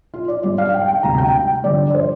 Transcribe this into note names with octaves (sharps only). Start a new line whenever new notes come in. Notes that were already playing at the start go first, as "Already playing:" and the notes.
F4
D5
G2 G3 D5
F5
G5
G5
D2 C3 G3 A#5
G5
G2 D3 F3 D5
C5